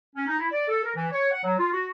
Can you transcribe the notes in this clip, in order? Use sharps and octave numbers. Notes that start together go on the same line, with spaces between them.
C#4
D#4
E4
D5
A4
A#4
E3
C#5
F#5
F#3
F4
F#4